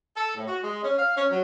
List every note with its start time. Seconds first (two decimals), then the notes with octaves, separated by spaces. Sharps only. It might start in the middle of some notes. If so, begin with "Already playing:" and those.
0.15 A4
0.34 A2
0.47 F#4
0.62 G#3
0.82 C#4
0.96 F5
1.15 C#4
1.30 F#3